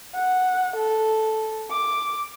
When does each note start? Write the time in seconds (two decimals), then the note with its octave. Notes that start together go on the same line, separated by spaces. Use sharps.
0.15 F#5
0.76 A4
1.71 D6